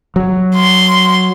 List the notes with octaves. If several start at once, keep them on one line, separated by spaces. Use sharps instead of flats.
F#3
C6